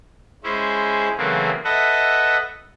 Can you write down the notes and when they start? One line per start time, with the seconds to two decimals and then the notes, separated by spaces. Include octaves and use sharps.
0.43 G#3 C#4 E4 C5
1.17 C#3 E3 F#3 A3 A#3 C4
1.64 A4 B4 D#5 E5 F#5